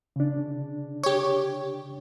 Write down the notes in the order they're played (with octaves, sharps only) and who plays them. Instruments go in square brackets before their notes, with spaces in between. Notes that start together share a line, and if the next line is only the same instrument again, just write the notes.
[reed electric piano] C#3 D4
[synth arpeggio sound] G4 C#5